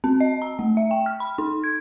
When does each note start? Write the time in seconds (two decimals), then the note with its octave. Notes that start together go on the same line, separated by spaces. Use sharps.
0.04 C4
0.20 D#5
0.42 A#5
0.59 A3
0.77 E5
0.91 G5
1.06 F6
1.20 B5
1.38 D#4
1.64 G#6